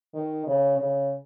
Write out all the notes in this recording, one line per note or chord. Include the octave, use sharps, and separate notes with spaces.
D#3
C#3
C#3